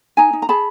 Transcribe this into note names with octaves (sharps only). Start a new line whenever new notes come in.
D#4 G#5 A#5
D#4
A#5
G#4 A5 B5